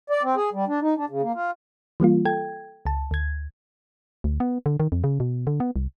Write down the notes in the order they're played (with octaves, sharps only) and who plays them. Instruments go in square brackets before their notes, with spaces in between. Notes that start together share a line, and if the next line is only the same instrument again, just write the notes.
[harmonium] D5
C4
G#4
G3
D4
D#4
D4
C#3
A#3
F4
[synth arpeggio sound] E3 G3 A#3 F4
A4 G5 G#6
C#2 A5
D2 G#6
[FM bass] D2
B3
D3
D#3
F2
C#3
B2
D3
B3
C2